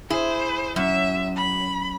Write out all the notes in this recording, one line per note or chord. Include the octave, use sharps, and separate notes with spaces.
E4 G#4 C5
F#2 F#3 C#4 E5
B5